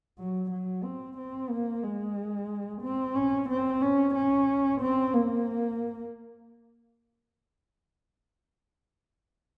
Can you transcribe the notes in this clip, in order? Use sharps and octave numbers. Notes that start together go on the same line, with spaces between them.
F#3
F#3
C4
C4
A#3
G#3
C4
C#4
C4
C#4
C#4
C4
A#3